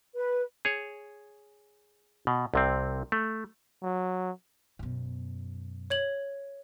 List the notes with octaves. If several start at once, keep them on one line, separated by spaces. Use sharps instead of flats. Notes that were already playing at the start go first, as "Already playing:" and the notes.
B4
G#4 C#5
B2
C2 C3 C4
A3
F#3
F#2 B2
C#5 G#6 F#7